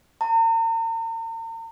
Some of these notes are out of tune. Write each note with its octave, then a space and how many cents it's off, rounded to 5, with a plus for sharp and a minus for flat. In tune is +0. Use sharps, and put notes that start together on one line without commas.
A#5 -45